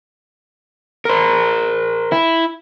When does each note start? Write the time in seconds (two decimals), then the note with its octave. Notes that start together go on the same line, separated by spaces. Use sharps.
1.05 A#4 C5
2.12 E4